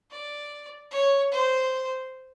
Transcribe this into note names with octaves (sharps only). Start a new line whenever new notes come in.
D5
C#5
C5